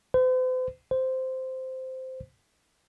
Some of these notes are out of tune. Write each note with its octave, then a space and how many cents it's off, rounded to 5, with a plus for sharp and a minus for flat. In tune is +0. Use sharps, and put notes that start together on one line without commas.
C5 -45
C5 -10